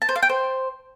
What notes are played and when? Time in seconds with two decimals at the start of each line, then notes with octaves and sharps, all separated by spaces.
0.02 A5
0.09 C5
0.16 F5
0.22 G5
0.29 C5